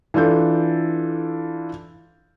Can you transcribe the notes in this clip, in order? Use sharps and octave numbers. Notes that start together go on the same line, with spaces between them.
E3 D4 F4 A4 G6